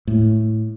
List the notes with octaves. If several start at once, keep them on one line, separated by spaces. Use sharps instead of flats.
A2